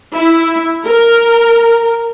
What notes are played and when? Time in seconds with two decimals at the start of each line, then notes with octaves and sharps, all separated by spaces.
0.14 E4
0.85 A#4